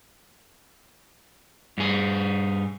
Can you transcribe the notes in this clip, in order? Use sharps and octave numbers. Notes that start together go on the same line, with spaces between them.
G2 G#4